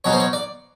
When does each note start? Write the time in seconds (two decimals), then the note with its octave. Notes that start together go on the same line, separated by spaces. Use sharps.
0.04 B2 F#3 B3 D#4 C#5
0.13 C5
0.20 C#5
0.33 D5